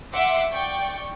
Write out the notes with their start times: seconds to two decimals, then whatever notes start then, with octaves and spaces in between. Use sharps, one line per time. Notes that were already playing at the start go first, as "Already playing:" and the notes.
0.13 E5 F#5 C6 D6 E6
0.51 D5 G5 C#6